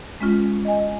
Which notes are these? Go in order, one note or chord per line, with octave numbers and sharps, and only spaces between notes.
G#3 C#4 F4
D#5 G#5